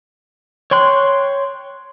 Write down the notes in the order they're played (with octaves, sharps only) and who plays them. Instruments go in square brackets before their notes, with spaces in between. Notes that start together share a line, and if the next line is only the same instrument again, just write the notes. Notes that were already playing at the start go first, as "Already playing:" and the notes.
[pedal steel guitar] C#5 G5 C6 F#6